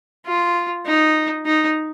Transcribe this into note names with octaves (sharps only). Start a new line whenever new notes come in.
F4
D#4
D#4